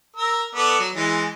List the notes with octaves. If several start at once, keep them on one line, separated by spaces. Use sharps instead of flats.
A#4 E6
B3 A4 D5
F#3
E3 G#3